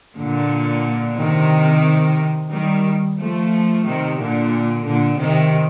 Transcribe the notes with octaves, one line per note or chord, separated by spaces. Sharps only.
A#2 D3
C3 D#3
D#3 G3
F3 A3
C3 D#3
A#2 D3
A#2 D3
C3 D#3